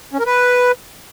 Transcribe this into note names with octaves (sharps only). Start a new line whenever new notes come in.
C#4
A#4
B4